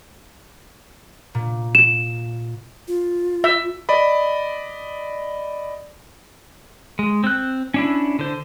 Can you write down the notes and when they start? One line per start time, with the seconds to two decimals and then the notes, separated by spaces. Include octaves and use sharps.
1.34 A#2
1.75 E7
2.88 F4
3.44 E5
3.89 D5 D#5 B5
6.99 G#3
7.24 C4 F#6
7.74 C#4 D4 E4
8.19 D3 C5